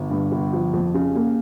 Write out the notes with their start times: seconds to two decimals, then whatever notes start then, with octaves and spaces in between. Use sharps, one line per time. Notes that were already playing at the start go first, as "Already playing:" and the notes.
Already playing: G1
0.10 G2
0.32 G1
0.53 F3
0.73 F2
0.94 C#3
1.15 A#3